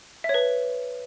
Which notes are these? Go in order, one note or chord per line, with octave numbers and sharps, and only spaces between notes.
E5
C#5
B4